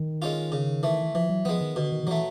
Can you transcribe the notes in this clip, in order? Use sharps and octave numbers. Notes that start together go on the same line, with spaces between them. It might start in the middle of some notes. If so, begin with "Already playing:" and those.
Already playing: D#3
G#3 C#4 F4
C#3
E3 A3
E3 F3
F#3
F3 G#3 B3
D#3
B2 D3
D#3
D#3
E3 F#3 A3